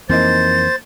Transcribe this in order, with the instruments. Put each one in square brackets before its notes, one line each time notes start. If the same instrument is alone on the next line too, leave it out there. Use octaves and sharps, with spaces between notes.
[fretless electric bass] F2 E3 C4 [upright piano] A#3 D#4 [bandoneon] C5 [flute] A6